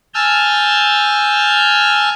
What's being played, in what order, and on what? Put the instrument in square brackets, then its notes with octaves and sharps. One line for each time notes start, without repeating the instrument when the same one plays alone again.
[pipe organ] G#5 A5 E6 F6 G6